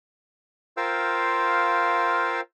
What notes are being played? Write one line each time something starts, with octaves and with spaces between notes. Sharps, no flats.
F4 A#4 C5 F5 G5 E6